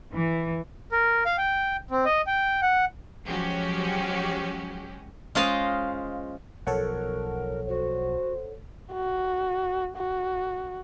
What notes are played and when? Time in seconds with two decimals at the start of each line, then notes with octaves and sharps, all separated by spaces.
0.15 E3
0.92 A#4
1.26 F5
1.38 G5
1.91 C4
2.05 D#5
2.27 G5
2.62 F#5
3.25 F3 F#3 G#3 C#4 F#4 G4
5.35 G#3 C#4 F4 C5 D#5 F5
6.67 B1 F3 A4 A#4 C#5 F#5
7.69 F#4 C5
8.92 F#4
9.96 F#4